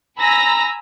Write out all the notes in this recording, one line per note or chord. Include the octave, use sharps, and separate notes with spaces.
G#5 A#5 B5 E6 A#6